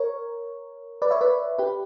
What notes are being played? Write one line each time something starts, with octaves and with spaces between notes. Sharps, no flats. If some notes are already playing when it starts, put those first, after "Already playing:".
Already playing: A#4 C#5
B4 D5
C#5 E5
B4 D5
G4 B4